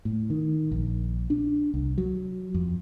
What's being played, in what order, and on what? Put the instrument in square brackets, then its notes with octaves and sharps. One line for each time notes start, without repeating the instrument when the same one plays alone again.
[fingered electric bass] A2
D#3
A#1
D4
C2
F#3
F2